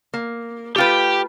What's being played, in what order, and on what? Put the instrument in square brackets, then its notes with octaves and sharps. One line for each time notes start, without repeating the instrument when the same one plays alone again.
[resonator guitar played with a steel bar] A#3
[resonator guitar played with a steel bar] A3 F4 B4 [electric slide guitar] G4 G5